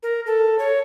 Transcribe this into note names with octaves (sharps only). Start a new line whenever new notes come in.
A#4
A4
C#5